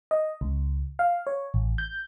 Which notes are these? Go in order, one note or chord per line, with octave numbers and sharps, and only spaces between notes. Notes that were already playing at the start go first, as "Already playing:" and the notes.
D#5
C#2
F5
C#5
A1
G6